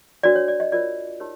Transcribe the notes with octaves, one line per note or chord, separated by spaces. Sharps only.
D4 F#4 A#4 C#5 D5
C#5
D5
D#5
F4 A#4 C#5 D5
D#4 G4 A#4 C#5